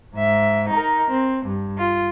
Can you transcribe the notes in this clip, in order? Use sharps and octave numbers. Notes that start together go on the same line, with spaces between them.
G#2 E5
D#4 A#4
C4
G2
F4